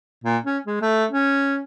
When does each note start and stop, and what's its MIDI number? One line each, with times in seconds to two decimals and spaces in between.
0.24 0.38 46
0.45 0.58 61
0.66 0.77 56
0.82 1.05 57
1.11 1.61 61